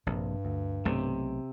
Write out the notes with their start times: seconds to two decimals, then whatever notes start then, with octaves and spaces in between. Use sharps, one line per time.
0.06 A#1 G2 C3
0.45 D2
0.85 B1 C3 A3